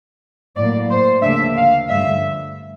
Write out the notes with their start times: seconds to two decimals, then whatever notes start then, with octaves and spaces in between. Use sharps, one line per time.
0.56 A2 F#3 A#3 D5
0.89 C5
1.22 D2 C#3 F3 A#3 D4 E5
1.56 F5
1.89 G2 D3 F3 A3 E5